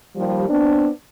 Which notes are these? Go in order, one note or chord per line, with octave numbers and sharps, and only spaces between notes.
D#2 F3 G3
B3 C4 D4